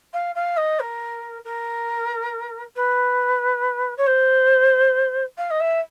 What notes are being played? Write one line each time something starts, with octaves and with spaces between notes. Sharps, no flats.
F5
F5
D#5
A#4
A#4
B4
C#5
C5
F5
D#5
E5